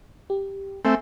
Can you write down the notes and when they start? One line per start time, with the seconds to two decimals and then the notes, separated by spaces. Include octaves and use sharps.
0.30 G4
0.85 A3 C4 E5 G#5